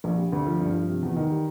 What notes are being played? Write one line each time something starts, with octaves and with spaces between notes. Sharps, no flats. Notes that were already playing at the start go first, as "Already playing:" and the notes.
A#1
G3
D2
F3
G2
F3
C3
E2
D#3
G3